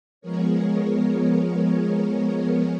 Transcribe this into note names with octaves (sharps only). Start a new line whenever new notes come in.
F3 G#3 B3 G#4 A#4 C#5